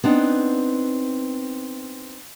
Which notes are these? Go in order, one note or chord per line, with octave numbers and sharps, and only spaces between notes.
B3 C4 D4 D#4